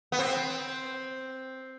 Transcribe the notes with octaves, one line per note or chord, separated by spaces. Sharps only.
B3
C4